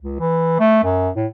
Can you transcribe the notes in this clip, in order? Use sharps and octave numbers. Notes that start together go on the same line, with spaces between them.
C#2
E3
A3
F#2
A2